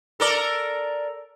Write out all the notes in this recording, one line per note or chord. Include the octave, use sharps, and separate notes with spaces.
A4 A#4 D5